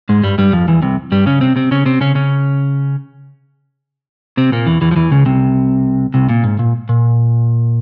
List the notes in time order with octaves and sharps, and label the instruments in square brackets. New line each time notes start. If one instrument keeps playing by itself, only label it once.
[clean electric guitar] G#2 G#3
G2 G3
G2 G3
F2 F3
E2 E3
C2 C3
G2 G3
C#3 C#4
C3 C4
C3 C4
C#3 C#4
C3 C4
C#3 C#4
C#3 C#4
C3 C4
A#2 A#3
E2 E3
E2 E3
F3
E2 E3
C#2 C#3
C2 C3
C2 C3
A#2
G#2
A#2
A#2